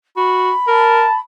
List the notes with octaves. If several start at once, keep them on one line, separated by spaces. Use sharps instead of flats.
F#4 B5
A#4 A5